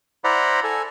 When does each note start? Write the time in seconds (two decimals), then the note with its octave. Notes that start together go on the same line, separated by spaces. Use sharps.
0.24 E4 C5 D5 F#5 A#5 B5
0.64 A4 G#5